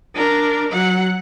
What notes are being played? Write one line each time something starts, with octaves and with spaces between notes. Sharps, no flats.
D4 A#4
F#3 F#5